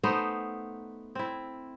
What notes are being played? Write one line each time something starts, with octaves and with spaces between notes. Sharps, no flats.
A3 B3 D#4 C5
C4 E4